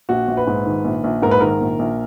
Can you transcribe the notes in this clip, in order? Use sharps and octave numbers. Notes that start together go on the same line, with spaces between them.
A#1 F#4
A#1
B4
G#2
D#3
A#1
A#1
G#2 A#4
B4
D#3 A#4
A#1
A#1